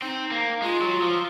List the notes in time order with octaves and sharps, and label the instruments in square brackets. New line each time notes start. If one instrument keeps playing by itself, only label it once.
[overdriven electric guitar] C4 [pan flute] D#4
[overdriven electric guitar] A#3
[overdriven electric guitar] G#3 [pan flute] F4
[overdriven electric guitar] F#3
F3